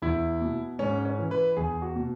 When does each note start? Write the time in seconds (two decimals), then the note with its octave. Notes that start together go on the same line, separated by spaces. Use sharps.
0.02 E2 E4
0.41 B2
0.79 G#2 C#4
1.05 C#4
1.19 E3
1.31 B4
1.57 E2 G#4
1.82 F#4
1.96 B2